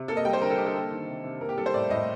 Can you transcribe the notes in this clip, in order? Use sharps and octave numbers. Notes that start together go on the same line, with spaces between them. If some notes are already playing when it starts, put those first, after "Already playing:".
Already playing: C3
A#3 A4
D#5
G3 G5
C5
D3 A#4
A4
D3 G4
A4
A#3
D#3
C3
C3
A#3 A#4
G4
G3 A4
C5
A2 D5
A2 D#5